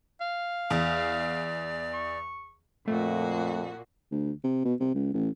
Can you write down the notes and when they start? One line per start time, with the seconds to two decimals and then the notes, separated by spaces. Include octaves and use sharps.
0.21 F5
0.70 E2 D5
1.94 C#6
2.88 F2 A#2 A3 F#4
4.11 D2
4.44 C3
4.65 B2
4.80 C3
4.94 C#2
5.14 A1